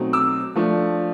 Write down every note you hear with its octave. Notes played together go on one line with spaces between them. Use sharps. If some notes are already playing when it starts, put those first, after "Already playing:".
Already playing: B2 F#3 A3 C4 D#4
D6 E6
F3 A3 D4